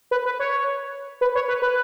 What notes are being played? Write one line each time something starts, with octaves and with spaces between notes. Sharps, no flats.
B4
B4
C#5
B4
C#5
B4
B4